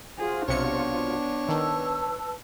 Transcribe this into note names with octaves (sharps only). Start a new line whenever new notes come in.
F4 F#4 G#4 C5
B1 C3 B3 D4 C#5 C#7
D#3 B4 A5 E6